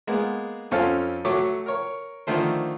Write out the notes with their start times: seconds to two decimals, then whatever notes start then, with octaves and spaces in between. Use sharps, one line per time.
0.07 G#3 A#3 B3
0.71 F2 C4 C#4 F4 A4 F5
1.25 F#3 A3 C#5 D6
1.66 A#4 C#5
2.27 D3 D#3 F3 A3 C5